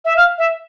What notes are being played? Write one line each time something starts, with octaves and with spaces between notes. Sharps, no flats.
E5
F5
E5